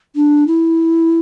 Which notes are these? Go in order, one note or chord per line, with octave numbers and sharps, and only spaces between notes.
D4
E4